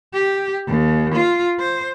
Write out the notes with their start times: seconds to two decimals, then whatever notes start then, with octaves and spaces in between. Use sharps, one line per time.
0.13 G4
0.67 D#2
1.14 F4
1.59 C5